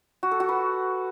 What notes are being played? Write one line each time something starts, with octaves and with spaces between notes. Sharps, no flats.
F#4
A4
F#4
B4